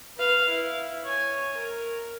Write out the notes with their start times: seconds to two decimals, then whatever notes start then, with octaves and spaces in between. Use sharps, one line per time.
0.16 B4 F5
0.48 E4
1.04 C#5 G#5
1.57 A#4